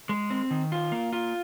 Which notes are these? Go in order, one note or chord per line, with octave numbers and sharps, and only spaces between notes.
G#3
C4
D#3
F4
A#3
F4